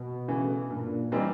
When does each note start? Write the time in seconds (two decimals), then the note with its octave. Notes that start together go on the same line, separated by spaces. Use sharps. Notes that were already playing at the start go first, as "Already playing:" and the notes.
Already playing: B2
0.28 C#3 E3 A3
0.70 G2 A#2
1.12 E3 G3 C4 D#4